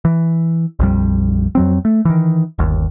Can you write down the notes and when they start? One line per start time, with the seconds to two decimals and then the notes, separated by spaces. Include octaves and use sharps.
0.05 E3
0.79 A#1 F2 G3
1.55 F2 F#3 C4
1.85 A3
2.05 D#3 E3
2.59 G1 D#2